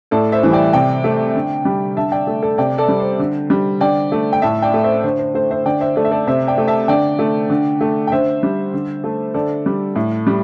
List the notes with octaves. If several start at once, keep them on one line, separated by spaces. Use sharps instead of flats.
A2 A4 D5
C5 E5
E3 G3
D5 G5
C3 D5 G5
A3
D3
G3
D3 E5 A5
D5 G5
A3
A4 D5
C3 D5 G5
A4 D5
G3
C5
D3
G3
D3 D5 G5
A3
G5
A2 E5 A5
D5 G5
A3
C5 E5
D3 C5
C5
A3 C5
C5 E5
D3 D5 G5
C5 E5
A3 A4 D5
E5
A4 D5
C3 C5 E5
D5 G5
A3
E5 A5
D3 D5 G5
A3
D3
A3
G5
D3 C5 E5
G3
D3
A3
D3 A4 D5
G3
A2
G3